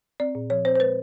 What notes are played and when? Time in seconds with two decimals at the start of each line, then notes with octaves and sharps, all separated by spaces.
0.20 C4 D5
0.35 A#2
0.50 F3 C#5
0.65 C4 C5
0.76 C5
0.80 G#3 B4